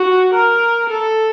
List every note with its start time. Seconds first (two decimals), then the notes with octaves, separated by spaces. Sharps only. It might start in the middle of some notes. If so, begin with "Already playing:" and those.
Already playing: F#4
0.34 A#4
0.90 A4